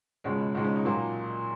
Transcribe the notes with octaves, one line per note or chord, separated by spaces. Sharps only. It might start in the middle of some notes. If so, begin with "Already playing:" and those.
C#2 B2 G#3 C#4
C#2 B2 G#3 D#4
C#4
D#4
A#2 F#3 A#3